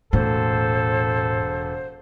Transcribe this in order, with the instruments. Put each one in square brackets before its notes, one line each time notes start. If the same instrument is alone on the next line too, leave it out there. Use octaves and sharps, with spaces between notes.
[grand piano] E1 [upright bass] A2 [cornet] A4 [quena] C5